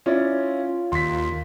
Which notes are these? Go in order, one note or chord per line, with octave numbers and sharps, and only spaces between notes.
C#4 E4 F4 D5
D#2 C6 B6